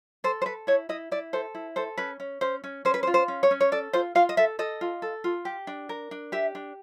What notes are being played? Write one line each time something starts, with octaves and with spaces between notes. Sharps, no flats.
A4 C5
C5
A4 B4
E4 C#5
E4 D#5
E4 D5
A4 C5
E4
A4 C5
C#4 B4
C#4
C#4 C5
C#4
C#4 C5
B4
C5
F4
C5
C#4
C#5
C#4
C#5
A4 D5
F4 C5
F4 F5
D#5
A4 E5
A4 D#5
F4
A4
F4
G4
D4
A#4
D4
G4 E5
D4